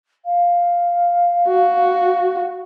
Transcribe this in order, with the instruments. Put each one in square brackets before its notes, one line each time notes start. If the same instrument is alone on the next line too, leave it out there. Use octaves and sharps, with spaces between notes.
[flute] F5
[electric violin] F#4